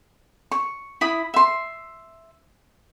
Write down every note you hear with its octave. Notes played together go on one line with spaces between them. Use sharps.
C#6
E4 B5 D#6
E5 C6